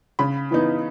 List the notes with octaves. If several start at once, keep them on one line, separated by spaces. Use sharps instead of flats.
C#3 B5
E3 B3 D#4